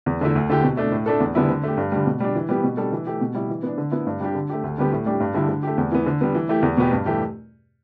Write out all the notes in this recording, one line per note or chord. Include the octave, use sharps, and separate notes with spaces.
E2
D3 A3 E4
D2
D3 A3 E4 G4
B2
A3 D4
A2
A3 D4 A4
E2
D3 G3 B3 E4
D3
A3 G4
G2
D3 G3
B2
G3 D4
E3
G3 B3 G4
B2
G3 D4 A4
E3
A3 G4
B2
G3 E4
E3
B3 D4
D3
B3 E4
G2
G3 D4 G4
D3
A3 G4
D2
D3 G3 B3 G4
A2
G3 D4 G4
G2
D3 G3 E4
D3
A3 G4
E2
E3 B3
D3
G3 B3
E3
A3 E4 G4
E2
B2 B3 G4
G2
E3 A3 G4